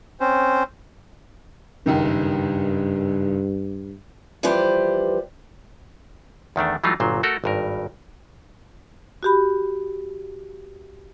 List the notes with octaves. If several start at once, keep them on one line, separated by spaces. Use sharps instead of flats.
C4 C#4 C5
F#1 C#2 G2 D#3
E3 F3 G3 G4 B4 C5
E2 D#3 A3 D4
E3 F#3 G3 A3 D#4 F4
G1 A#2 F#3 C5
A3 F#4 A4 A#4
G#1 G2 A#4
F#4 G4 B5